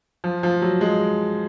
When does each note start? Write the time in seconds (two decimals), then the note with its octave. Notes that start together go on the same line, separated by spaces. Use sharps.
0.24 F3
0.43 F3
0.62 F#3
0.81 G#3